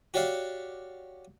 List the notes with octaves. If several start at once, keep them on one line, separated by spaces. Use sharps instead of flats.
F#4 G4 C#5 D5 F5 F#5